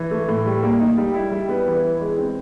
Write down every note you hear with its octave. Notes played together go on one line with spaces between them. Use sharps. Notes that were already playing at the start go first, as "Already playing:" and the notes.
Already playing: E3
A3
A2
G3
A#3
D#4
G3
E4
G3
B3
E3
E4
G#3
C4